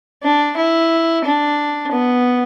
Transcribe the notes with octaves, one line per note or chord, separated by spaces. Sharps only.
D4
E4
D4
B3